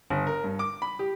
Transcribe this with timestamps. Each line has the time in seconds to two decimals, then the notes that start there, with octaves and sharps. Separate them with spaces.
0.10 G1
0.27 A#4
0.44 G2
0.59 D6
0.82 B5
0.99 G4